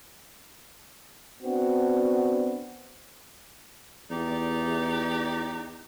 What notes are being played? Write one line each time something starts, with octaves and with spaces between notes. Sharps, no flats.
B3 C4 D4 F#4
E2 D#4 G4 D5